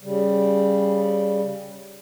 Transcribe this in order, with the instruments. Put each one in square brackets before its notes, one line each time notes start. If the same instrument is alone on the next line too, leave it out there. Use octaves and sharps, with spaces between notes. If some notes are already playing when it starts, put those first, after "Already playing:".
[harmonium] C#3 G3